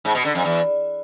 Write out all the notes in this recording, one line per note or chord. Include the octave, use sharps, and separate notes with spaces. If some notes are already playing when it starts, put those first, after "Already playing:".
G#2
B2
D3
F2
E2